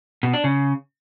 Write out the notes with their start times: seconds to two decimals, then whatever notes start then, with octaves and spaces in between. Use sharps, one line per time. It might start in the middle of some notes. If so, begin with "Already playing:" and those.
0.23 B2
0.34 D4
0.44 C#3